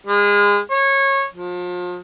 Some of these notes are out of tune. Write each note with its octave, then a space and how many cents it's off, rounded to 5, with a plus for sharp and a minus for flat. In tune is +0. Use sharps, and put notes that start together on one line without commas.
G#3 -30
C#5 -20
F3 +35